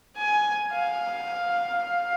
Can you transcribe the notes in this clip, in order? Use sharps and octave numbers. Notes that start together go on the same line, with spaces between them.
G#5
F5